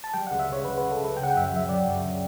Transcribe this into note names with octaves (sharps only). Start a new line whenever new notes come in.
A5
G3 G5
C#2 F#5
E5
C#3 C#5
C#2 B4
B4
C#3
A4
C#2 B4
C#3 G5
F#5
G5
F#2 E5
F#5
F#3 E5
C#3 D5
F#2
C#3